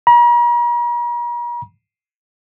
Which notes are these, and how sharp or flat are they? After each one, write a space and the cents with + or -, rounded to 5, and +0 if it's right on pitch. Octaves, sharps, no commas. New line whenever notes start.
A#5 +45